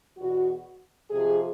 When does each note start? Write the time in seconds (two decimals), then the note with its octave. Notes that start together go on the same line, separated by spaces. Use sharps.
0.17 E2 B2 F#4
1.11 F2 C3 F3 G#4